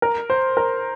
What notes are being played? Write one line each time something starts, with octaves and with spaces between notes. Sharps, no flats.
A#4
C5
A#4